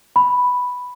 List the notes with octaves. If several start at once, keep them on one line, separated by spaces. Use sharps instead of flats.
B5